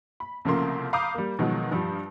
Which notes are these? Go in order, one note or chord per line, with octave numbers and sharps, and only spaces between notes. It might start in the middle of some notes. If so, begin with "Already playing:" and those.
B5
C2 C#3 F3 A3 A#3 C6
F5 A#5 B5 D6 D#6 G6
G3 A#3
B2 D#3 F3 F#3 G#3
G2 F3 G3